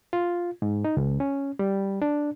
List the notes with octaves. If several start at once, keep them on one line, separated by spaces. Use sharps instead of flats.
F4
G#2
D#4
C#2
C#4
G3
D4